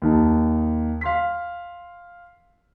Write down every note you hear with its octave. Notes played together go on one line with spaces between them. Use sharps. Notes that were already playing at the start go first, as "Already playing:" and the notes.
D#2 D#4 A5
F5 C6 B6